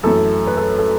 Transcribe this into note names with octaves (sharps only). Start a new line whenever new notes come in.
F#2 E3 A3 A4
B4
A4
A4